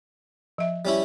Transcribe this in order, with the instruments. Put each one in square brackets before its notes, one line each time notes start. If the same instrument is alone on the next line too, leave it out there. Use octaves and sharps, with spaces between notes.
[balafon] F3 E5
[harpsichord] G3 C#4 E4